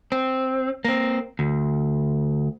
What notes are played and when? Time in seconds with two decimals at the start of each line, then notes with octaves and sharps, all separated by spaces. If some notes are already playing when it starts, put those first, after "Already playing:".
0.12 C4
0.85 A#3 C4
1.39 D2